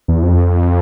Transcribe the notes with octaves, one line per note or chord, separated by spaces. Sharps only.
E2
F2